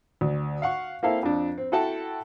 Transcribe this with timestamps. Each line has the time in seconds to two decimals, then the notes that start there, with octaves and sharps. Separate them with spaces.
0.21 D2
0.62 F5 F#5 C#6
1.03 A#3 C4 E4 A4 F5 G5
1.23 F2 D4
1.58 C4
1.72 E4 F#4 A4 F#5 G5 A5